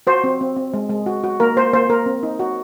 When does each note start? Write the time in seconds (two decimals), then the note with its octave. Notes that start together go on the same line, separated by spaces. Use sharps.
0.07 F#4 C5
0.24 C4
0.41 C4
0.57 C4
0.74 G#3
0.90 G#3
1.06 F#4
1.24 F#4
1.40 A#3 A#4
1.56 A#3 C5
1.73 A#3 C5
1.90 A#3 A#4
2.06 C4
2.23 D#4
2.40 F#4